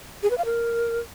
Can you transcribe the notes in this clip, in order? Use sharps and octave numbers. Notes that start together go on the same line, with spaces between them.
G#4
B4
F5
A#4